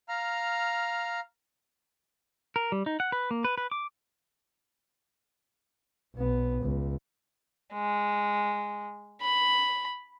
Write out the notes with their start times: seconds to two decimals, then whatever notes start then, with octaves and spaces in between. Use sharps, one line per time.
0.09 F5 A#5 F6
2.56 A#4
2.72 G3
2.86 D#4
3.00 F#5
3.12 B4
3.31 A#3
3.44 B4
3.58 B4
3.71 D6
6.16 B1 B3
6.61 C#2
7.74 G#3
9.22 B5